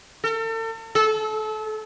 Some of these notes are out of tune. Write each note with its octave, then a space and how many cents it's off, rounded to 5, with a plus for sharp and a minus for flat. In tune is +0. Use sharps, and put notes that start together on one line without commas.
A4 +40
A4 -30